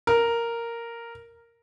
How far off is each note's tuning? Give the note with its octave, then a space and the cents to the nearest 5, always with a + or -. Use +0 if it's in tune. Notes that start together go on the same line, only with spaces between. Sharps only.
A#4 -5